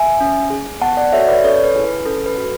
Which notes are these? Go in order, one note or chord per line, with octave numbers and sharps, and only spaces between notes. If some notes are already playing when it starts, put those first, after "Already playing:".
Already playing: E5 G#5
C#4
G#4
B3 F#5 A5
D5 F#5
F#4 A4 C#5 E5
B4 D5
C#4 A4 C#5
B4
E4 G#4
B4
C#4 A4
B4
F#4 A4